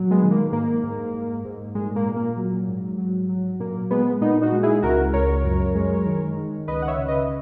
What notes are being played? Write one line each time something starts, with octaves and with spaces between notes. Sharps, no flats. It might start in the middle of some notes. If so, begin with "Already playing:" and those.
Already playing: A#2 F#3
G#3 B3
D#3
A#3
G#2 A#3
G#2
G#2
G#2
A#2 G#3
A#3
A#2
A#3
F#3
G#2
F#3
F#3
A#2 A#3
A#2 G#3 B3
A#2 B3 D#4
D#4 F#4
G#3
E4 G#4
C#2 F#4 A#4
C#2 A#4 C#5
F#2
G#3
D#3
D#3
C#2 B4 D#5
F#5
C#5 E5
C#3
B4 D#5